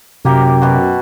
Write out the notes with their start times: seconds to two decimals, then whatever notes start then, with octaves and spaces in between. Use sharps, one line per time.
0.25 F#2 C3 A#3 G4 A#4
0.62 B2 F#4